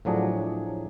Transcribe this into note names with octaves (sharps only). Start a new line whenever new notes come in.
A2 F3 F#3 D4 G#4